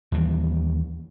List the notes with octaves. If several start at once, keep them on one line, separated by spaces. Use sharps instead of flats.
D#2 E3 G3